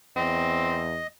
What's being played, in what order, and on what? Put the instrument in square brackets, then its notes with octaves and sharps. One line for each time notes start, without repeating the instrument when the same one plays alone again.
[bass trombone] E2 [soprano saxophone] C4 [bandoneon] D#5